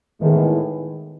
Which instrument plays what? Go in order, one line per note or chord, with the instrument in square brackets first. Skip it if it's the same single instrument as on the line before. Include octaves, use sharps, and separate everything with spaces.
[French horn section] A2 G#3 B3 E4 G#4 [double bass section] D#3